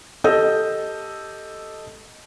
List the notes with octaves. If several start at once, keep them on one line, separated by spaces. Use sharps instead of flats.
G4 A4 D#5 D#6 E6 G6